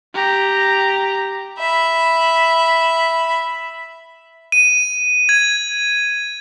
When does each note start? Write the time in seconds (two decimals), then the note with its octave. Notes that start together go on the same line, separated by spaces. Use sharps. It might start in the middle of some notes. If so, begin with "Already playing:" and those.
0.14 G4 A#5
1.59 E5 B5
4.52 D#7
5.29 G#6